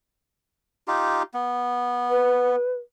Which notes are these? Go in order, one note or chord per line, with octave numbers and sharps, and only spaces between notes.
D#4 F4 G4
B3
B4